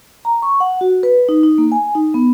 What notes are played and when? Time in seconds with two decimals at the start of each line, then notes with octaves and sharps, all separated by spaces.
0.25 A#5
0.42 C#6
0.60 F#5
0.81 F#4
1.03 B4
1.29 D#4
1.43 D#4
1.58 A#3
1.72 G#5
1.95 D#4
2.14 B3